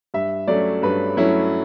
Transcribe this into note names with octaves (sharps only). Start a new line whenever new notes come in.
G2 E5
F#3 A3 C#4 D5
G2 B4
F#3 A3 C#4 E4